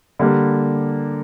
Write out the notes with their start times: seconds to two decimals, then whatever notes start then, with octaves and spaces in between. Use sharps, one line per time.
0.19 D3 G3 A#3